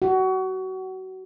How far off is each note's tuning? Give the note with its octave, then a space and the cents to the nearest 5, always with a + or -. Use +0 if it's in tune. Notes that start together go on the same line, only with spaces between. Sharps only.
F#4 +25